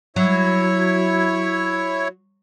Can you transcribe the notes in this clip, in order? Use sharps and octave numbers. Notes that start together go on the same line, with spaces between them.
F#3 E4 C#5